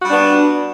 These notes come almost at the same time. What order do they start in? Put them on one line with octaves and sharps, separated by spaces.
F#4 G3 D4 B3